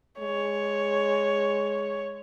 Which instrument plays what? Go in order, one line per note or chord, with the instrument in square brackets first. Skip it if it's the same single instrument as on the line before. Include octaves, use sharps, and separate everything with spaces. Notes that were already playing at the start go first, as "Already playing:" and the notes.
[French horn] G#3 [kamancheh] C#5